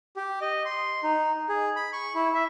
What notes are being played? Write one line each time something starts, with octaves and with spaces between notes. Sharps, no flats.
G4
D#5
C6
D#4
G#4
B5
C#6
E4
E5